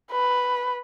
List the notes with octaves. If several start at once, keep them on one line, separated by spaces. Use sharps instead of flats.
B4